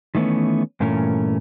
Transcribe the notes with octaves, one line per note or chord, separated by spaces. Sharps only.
D#3 E3 A3 B3 C#4
G2 A#2 E3 A3 C#4 A#4